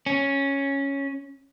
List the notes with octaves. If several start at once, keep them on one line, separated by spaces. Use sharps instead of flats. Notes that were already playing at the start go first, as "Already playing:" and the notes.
C#4